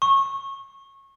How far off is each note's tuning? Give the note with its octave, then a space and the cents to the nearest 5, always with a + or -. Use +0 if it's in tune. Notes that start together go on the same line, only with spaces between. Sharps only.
C#6 -25